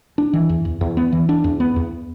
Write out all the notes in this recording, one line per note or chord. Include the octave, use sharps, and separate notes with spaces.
D4
E3
E2
E2
E2
B3
E3
D4
E2
B3
E2